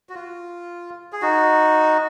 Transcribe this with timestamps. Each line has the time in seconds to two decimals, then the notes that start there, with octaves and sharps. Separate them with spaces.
0.09 F#4
0.15 F4
1.12 G#4
1.22 D#4 F#4